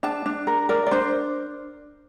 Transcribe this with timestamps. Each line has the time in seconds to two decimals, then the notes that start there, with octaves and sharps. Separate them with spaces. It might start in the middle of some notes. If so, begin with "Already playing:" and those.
0.03 D4 A5
0.26 D4
0.47 A#4
0.69 A#4 D5
0.86 D5
0.91 D4 C5